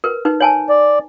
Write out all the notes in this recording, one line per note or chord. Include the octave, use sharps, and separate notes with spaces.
A#4 B4
D#4 B4
C#5 G#5 A5
D5